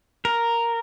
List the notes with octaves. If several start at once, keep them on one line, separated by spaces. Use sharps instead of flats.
A#4